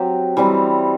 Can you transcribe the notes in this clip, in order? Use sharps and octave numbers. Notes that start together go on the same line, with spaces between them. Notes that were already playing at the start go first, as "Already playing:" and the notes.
Already playing: F#3 C4 G4
E3 G3 C4